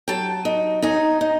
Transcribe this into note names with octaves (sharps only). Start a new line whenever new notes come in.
F#3 G5 A5
D#4
D#4 G#5 A#5
D#4